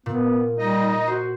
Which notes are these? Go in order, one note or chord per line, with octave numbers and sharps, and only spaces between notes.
A#2 B3
G3 D#4 D#5
F#4 C5